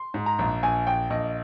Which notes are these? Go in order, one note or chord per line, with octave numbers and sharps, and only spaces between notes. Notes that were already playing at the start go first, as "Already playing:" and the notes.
Already playing: C6
G#2
A#5
A#1
A#1 G#5
A#1 G5
A#1 D#5